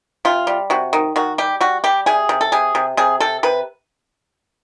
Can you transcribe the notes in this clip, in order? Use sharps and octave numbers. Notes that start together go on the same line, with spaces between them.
C3 F4
G3
C3 F#4
D#3
D#3 F#4
G3 G4
G3 F#4
G3 G4
C3 G#4
C3
A4
C3 G#4
C3
C3 G#4
C3 A4
C3 B4